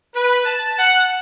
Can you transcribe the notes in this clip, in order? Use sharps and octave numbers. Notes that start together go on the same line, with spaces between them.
B4
A5
F#5